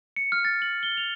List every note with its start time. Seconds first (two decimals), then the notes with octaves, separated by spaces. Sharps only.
0.16 C#7
0.32 F6
0.45 A6
0.62 F#7
0.83 G7
0.97 F7